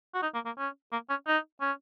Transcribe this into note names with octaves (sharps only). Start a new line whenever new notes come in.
F#4
D#4
A#3
A#3
C#4
A#3
C#4
D#4
C#4